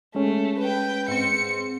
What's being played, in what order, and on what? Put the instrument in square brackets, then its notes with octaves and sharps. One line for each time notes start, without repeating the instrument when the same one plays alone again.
[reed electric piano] G#3 C#4 [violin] A3
[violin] B4 G5
[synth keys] G#2 C4 [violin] C#7